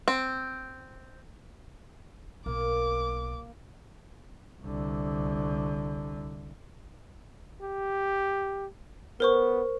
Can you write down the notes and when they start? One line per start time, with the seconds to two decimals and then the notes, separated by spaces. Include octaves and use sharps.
0.08 C4
2.46 B1 A#3 D6
4.63 C2 D3
7.62 G4
9.20 B3 A#4 C5 C#6